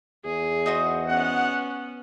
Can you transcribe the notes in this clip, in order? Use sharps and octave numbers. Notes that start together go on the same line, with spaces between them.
E2 G#4
D#4 F#4 C5
B3 C#4 F#5